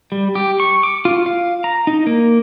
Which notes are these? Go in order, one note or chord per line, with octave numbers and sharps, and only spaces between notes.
G3
G4
C#6
D6
F4
F5
A#5
D#4
A#3